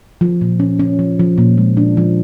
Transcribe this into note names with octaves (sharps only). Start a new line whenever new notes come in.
F3
A#2
C#4
C#4
F3
F3
A#2
G#3
D4
F3